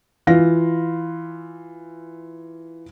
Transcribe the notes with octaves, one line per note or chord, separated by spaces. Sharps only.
E3 F4 F5 A#6